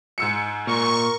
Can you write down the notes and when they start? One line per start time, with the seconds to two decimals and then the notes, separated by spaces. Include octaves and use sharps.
0.18 G#2 E6 C#7
0.67 A#2 A#4 C#6